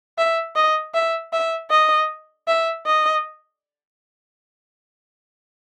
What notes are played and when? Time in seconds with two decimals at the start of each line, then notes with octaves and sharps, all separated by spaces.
0.18 E5
0.56 D#5
0.94 E5
1.33 E5
1.71 D#5
2.48 E5
2.86 D#5